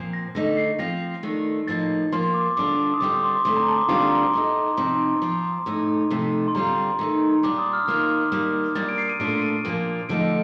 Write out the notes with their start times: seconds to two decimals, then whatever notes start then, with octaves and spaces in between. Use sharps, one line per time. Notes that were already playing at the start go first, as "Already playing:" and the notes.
Already playing: A#2 F3 C4
0.13 A#6
0.35 D3 A3 D#4 A#6
0.57 C7
0.79 F3 C4 F4 A#6
1.23 D#3 A3 D4 F4
1.67 A2 F3 A#3 D#4 A6
2.12 F3 A#3 F4 C6
2.34 D6
2.56 D3 G3 D4 F4 D6
2.94 D#6
3.00 D3 G3 C4 F4 D6
3.23 C6
3.45 D3 A3 C4 C6
3.56 A#5
3.68 A5
3.78 D6
3.89 D3 G3 C4 F4 C6
4.03 A#5
4.18 C6
4.33 A2 A3 D#4
4.77 C3 F3 C4 D#4 C6
5.22 F3 C4 F4
5.66 A2 A3 D#4
6.10 C3 F3 A3 D#4
6.48 C6
6.55 D3 G3 C4 F4 A#5
6.99 D#3 A3 D#4
7.43 A#2 G3 D4 F4 D6
7.59 D#6
7.73 F6
7.87 D#3 A#3 F4 F6
8.32 D#3 G3 A#3
8.75 A#2 G3 A#3 D4 A6
8.89 D7
8.98 C7
9.09 D#7
9.20 A#2 A3 D4 F4 D7
9.42 D#7
9.65 A#2 F3 A#3 D4
10.09 D3 F3 A3 D#4 D7